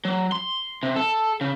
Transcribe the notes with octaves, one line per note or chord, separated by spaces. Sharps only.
F#3
C6
C3
A4
C#3